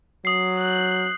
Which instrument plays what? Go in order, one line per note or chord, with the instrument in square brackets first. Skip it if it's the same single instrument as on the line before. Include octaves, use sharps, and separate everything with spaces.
[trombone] F#3 [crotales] D#6 C7
[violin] F#6 G6